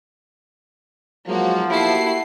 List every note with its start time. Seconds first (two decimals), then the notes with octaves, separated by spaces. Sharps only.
1.27 B1 F3 F#3 G#3 A#3 F#4
1.70 A3 A#3 E4 F#4 G4 C7